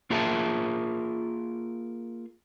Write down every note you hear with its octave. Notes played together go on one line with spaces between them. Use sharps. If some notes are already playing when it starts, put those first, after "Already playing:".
A#3 F4 G#4 A#4 E5 A5